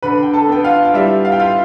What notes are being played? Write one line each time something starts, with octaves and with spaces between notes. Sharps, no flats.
D3 B4 B5
G5
A4 A5
B3 G5
F4 F5
F5
G3 E4 E5
F5
G5
F4 F5